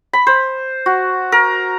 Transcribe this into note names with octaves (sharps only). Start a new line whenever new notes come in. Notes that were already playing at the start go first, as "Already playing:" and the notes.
B5
C5
F#4
A#4